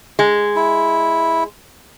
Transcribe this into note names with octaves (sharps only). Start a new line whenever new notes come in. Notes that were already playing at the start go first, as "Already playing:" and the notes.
G#3
E4